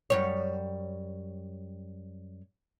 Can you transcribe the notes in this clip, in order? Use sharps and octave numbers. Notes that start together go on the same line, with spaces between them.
F#2 G3 C#5